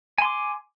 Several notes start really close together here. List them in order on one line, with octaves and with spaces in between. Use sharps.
G#5 C6 D6